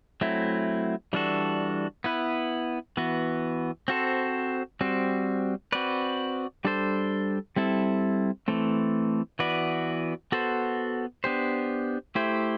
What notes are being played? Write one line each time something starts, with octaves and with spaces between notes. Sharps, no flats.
F#3 A3 C4 E4
E3 G3 D4 F#4 A4
B3 E4 B4
E3 B3 F#4
C4 F#4 A4 C5
G3 C4 F#4 C5
C4 F#4 B4 D5
G3 D4 A4 C5
G3 C4 E4 A4
E3 A3 C4
E3 B3 F#4 B4 D5
B3 F#4 A4 C5
B3 D4 G4 C5
A3 E4 G4 C5